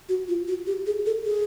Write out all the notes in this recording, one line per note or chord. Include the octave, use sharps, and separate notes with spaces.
F#4
F4
F#4
G4
G#4
A4
G#4